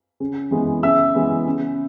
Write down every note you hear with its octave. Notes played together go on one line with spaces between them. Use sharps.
C#3
E3 G#3 B3
C#3 E5 E6
E3 G#3 B3
C#3